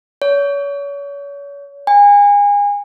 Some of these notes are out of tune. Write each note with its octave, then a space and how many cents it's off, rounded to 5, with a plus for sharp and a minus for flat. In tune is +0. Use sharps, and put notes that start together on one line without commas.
C#5 +35
G#5 -30